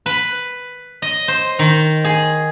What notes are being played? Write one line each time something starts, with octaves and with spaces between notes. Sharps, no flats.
B4
D#5
C5
D#3
G#4